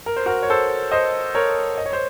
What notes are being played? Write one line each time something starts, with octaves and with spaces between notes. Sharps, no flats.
A#4
C5
F#4 A#4
C#5
A4 C5
C5 D#5
A#4 C#5
D#5
C#5
C5